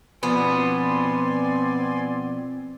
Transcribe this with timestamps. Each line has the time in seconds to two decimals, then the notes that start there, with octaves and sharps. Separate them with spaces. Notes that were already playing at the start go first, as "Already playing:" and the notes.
0.23 B2 F3 B3 C4 D5 G#5 C6